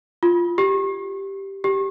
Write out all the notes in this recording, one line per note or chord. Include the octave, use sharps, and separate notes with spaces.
F4
G4
G4